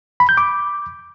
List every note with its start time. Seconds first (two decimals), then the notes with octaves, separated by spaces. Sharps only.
0.20 B5
0.29 G6
0.37 D6